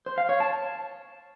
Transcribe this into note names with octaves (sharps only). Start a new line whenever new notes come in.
C5
F5
C#5
A5